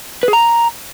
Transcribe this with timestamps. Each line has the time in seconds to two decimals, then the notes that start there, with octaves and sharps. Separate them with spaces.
0.23 B4
0.28 G#4
0.33 A#5